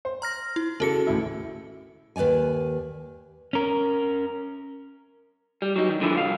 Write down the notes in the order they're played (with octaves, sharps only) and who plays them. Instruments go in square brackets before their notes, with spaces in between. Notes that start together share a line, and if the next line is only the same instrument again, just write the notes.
[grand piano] C5
[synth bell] A#5 F6 A#6
E4
[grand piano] C#3 A4 [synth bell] C#4 F#4 C#7
[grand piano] A1 D2 E4
[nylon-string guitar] D#2 B4 C#5 D5 G#5
[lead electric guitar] C#4 A#4
[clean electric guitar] G3
F#3 D#4
D#3
G2 D3 F3 E4
C2 F5